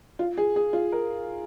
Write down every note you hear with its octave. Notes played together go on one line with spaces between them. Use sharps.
F4
G#4
G#4
F4
A#4